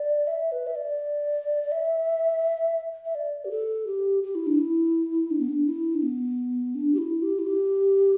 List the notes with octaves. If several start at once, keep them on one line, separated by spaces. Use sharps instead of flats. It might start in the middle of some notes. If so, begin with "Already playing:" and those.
Already playing: D5
E5
B4
E5
D5
E5
E5
D5
G4
A4
G4
G4
E4
D4
E4
D4
B3
D4
E4
D4
B3
D4
G4
E4
G4
E4
G4